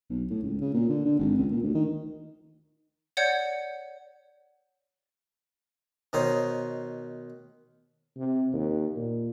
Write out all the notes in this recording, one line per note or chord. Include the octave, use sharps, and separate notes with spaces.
B1
A2
C#2
C#3
A#2
D3
D3
G#1
C#2
A#2
D2
D#3
C#5 D5 F#5 G6 G#6 C#7
B2 D#3 D#4 C5 C#5
C3
D#2
A#2